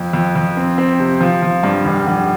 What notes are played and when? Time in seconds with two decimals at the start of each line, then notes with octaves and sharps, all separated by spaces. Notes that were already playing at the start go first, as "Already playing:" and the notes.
Already playing: F2
0.13 F2
0.36 F2
0.57 C4
0.78 C4
1.00 C3
1.21 F3
1.42 F3
1.63 G2
1.85 F1
2.07 F1